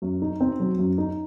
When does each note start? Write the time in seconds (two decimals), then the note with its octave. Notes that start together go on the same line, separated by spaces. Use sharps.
0.02 F#2
0.22 D#4
0.41 C4
0.60 F#3
0.78 F#2
0.98 D#4